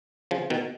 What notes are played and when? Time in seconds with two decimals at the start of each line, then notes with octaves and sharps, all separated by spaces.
0.31 C#3 F3
0.50 B2 D#3